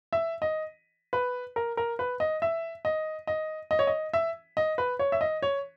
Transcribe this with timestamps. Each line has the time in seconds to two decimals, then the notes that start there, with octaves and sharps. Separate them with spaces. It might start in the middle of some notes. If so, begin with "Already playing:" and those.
0.13 E5
0.42 D#5
1.13 B4
1.56 A#4
1.77 A#4
1.99 B4
2.20 D#5
2.42 E5
2.85 D#5
3.27 D#5
3.71 D#5
3.79 C#5
3.87 D#5
4.13 E5
4.57 D#5
4.78 B4
4.99 C#5
5.12 E5
5.21 D#5
5.42 C#5